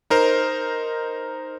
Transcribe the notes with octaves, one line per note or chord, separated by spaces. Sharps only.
D#4 A#4 C5